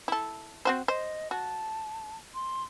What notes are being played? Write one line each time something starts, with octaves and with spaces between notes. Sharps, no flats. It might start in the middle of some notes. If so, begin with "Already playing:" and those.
E4 A4
C4 F#4 C5
C5 D#5
F#4 A5
C6